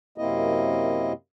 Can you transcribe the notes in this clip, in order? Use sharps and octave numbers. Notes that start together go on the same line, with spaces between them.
F#2 C3 A#3 C4 E4 D#5